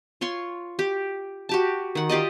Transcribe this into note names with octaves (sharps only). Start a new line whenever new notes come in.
F4 C#5 C6 C#6
G4
F#4 G4 A5
D#3 F#5
F4 G4 D5 D#5